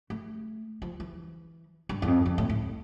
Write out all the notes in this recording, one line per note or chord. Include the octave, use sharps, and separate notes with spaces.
A3
F3
E3
G2
E2
F2
F2
A2
A2